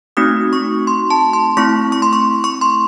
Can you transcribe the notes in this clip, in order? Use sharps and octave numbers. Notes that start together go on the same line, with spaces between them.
A3 C4 D#4 F#4 D#6
C#6
C6
A5
C6
A3 C4 E4 C#6
C#6
C6
C#6
C#6
C6